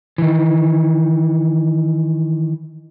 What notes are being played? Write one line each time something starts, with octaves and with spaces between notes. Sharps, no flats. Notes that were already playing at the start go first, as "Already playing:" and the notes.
D#3 E3